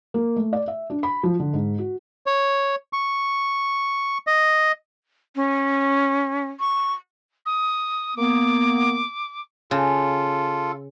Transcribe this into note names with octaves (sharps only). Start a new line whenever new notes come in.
A#3
A3
D5
E5
D4
B5
F3
D3
G#2
F#4
C#5
C#6
D#5
C#4
C#6
D#6
A#3 B3 D6
C#3 F4 A4